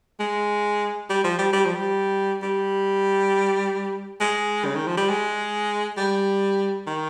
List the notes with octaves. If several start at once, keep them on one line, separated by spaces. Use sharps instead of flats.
G#3
G3
F3
G3
G3
F3
G3
G3
G#3
C#3
D#3
F3
G3
G#3
G3
D#3